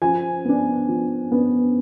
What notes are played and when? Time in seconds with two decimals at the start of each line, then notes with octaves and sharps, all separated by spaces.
0.02 F3 G#5
0.45 B3 D4
0.88 F3
1.32 B3 D4